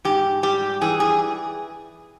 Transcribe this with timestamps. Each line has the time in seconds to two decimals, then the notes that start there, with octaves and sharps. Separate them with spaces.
0.05 G#2 G4
0.43 G3 G4
0.81 E3 G#4
1.00 G#4